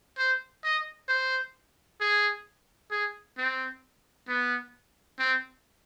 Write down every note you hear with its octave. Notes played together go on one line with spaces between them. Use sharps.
C5
D#5
C5
G#4
G#4
C4
B3
C4